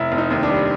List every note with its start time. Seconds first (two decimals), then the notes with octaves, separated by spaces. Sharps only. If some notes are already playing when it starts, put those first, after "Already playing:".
Already playing: F1 E4
0.12 F1
0.18 D#4
0.30 D#2
0.43 D4
0.49 G3